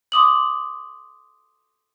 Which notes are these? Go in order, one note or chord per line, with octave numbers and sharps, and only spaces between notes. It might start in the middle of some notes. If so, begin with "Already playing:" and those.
C6 D6 D#6 F#7